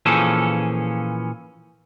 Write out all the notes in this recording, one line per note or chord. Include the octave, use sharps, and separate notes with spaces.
A#2 E3 F3 C#4 G#4 A4